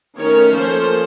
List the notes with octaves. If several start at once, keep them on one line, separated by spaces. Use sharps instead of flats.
D#3 A3 C#4 A#4 C#5
F3 A#3 C#4 A4 C5